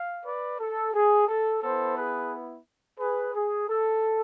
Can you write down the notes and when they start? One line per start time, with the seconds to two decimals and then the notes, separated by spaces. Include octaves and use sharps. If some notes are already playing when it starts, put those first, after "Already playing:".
Already playing: F5
0.26 B4 D5
0.60 A4
0.94 G#4
1.28 A4
1.63 B3 E4 A4 C5
1.97 G#4 B4
2.99 G#4 B4
3.34 G#4
3.68 A4